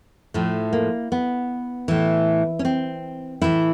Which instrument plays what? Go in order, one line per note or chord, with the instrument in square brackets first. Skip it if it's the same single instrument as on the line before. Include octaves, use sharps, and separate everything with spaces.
[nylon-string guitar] A2 F3 A3
A#3
B3
A2 E3
C#4
C4
A2 E3 E4